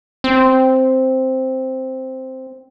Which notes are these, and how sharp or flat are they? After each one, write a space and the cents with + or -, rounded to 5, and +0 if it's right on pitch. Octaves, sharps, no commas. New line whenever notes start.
C4 +0